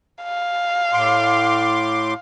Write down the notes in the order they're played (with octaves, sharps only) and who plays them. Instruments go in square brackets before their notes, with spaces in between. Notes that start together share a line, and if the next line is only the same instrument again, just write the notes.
[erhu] F5
[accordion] A2 C6 D6